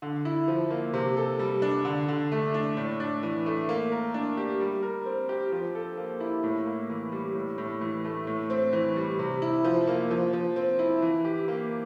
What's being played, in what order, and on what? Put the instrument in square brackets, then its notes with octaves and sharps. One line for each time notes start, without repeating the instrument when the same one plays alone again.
[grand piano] D3
E4
F3
A#3
C3
A4
G3
D4
D3
D3
A3
D4
A2
D4
E3
A3
A#3
A#4
D4
G4
G3
A#4
C4
G4
F3
A4
A#3
E4
A2
A#3
E3
G3
A2
A2
E3
A3
A2
C4
E3
G3
C3
E4
F3
A#3
F3
F3
C4
E4
E3
G4
A#3